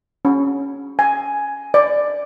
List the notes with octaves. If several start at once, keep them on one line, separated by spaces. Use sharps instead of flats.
C#4
G#5
D5